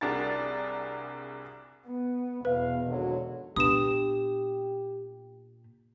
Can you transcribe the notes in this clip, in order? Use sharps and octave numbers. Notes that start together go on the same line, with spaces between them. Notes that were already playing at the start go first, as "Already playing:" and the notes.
C2 D4 F#4 G#4 A#4 A6
B3
E2 B2 B4 F5
G#1 D3 F#3
A#2 B3 D4 G4 B4 D#6 E7